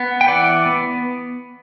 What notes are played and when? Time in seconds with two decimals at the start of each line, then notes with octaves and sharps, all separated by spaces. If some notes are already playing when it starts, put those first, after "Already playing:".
Already playing: B3
0.21 G5
0.28 E3 D5 F#5
0.66 B3